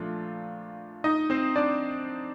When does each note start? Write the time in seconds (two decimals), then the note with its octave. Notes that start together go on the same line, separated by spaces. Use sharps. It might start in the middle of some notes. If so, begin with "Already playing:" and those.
Already playing: A#2 F3 A3 D4 F4
1.04 D#4 D#5
1.30 C4 C5
1.56 D4 D5